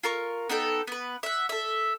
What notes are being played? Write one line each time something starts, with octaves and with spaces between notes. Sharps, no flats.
F4 A#4 C#6
B3 D#4 A4 G5
B3 B4
E5 F#5
A4 E5